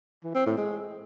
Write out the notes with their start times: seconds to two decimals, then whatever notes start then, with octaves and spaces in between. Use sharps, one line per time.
0.24 E3
0.35 C4
0.46 A2
0.57 G#3